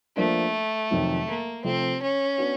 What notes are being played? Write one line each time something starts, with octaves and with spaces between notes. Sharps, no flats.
F3 A3 A#3 D4
F2 C3 D#3 F#3
A#3
C3 F3 A3 C4
C#4
B3 D4 F#4